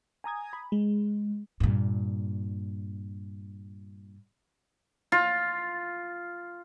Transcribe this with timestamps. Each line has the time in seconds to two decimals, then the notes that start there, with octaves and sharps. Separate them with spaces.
0.24 G#5 A#5 D#6 G#6
0.53 B5
0.72 G#3
1.60 G2 A#2
5.12 F4